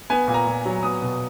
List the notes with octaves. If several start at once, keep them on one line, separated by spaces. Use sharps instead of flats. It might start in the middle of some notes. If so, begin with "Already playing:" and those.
B3 G#5
A#2
A#5
A#2
F#3
B3 D#6
B2